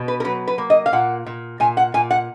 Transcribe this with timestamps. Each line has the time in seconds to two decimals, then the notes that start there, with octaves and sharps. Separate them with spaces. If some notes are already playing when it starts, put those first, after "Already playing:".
Already playing: B2
0.08 B4
0.20 A#4
0.24 F#3 B4
0.48 B4
0.58 A#3
0.70 D#5
0.86 F5
0.93 A#2 F#5
1.26 A#2
1.60 A#2 G#5
1.77 F#5
1.94 A#2 G#5
2.11 F#5